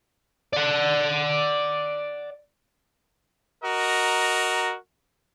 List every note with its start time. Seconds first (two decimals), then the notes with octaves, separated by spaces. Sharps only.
0.53 D5 F#5
3.63 F#4 A#4 D#5 A#5